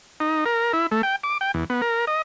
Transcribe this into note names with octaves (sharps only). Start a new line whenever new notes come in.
D#4
A#4
E4
A3
G5
D6
G5
E2
B3
A#4
D#5